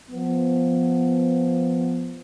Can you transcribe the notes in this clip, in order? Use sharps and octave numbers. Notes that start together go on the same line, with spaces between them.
F3 B3